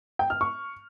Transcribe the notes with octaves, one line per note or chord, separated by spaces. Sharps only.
G5
F6
C#6